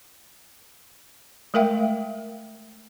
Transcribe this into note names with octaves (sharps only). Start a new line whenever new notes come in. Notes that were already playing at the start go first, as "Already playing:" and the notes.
G#3 A3 A#4 E5 F5 G5